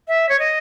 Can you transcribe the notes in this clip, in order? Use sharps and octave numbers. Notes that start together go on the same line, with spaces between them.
E5
C#5
D#5